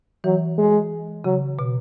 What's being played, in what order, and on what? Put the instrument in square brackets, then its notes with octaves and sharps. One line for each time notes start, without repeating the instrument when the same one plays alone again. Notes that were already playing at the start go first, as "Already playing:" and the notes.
[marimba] E3 [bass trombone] F#3
[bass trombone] G#3
[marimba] C#3 [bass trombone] F#3
[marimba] B2